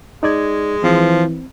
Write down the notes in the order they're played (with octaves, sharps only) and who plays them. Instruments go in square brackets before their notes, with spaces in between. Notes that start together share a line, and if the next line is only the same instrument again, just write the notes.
[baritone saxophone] G#3 [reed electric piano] D#4 D5 G#6
[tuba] E3 [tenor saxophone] F3 [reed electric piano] C4